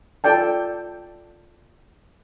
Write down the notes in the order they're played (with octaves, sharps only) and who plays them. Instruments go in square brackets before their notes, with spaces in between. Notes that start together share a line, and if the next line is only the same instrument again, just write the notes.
[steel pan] F4 A4 D5 G5 A5